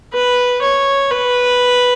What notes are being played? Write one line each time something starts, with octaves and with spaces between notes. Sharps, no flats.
B4
C#5
B4